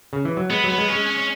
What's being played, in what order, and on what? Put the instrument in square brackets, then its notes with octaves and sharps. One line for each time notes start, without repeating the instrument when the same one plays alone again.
[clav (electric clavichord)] C#3
E3
F#3
[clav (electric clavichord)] G#3 [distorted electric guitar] B3
[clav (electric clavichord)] F#3
[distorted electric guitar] B3
[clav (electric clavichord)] G#3
[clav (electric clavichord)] G#3 [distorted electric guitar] C#4
[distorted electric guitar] C#4
C#4